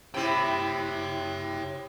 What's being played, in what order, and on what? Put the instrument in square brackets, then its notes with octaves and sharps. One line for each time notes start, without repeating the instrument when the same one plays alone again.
[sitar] C3 E4 [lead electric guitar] C#5 G5